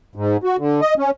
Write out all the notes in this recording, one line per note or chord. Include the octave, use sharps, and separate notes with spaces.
G#2
F#4
D3
D#5
C#4